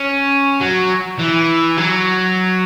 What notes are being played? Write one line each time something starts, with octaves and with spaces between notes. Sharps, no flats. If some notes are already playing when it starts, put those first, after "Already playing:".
Already playing: C#4
F#3
E3
F#3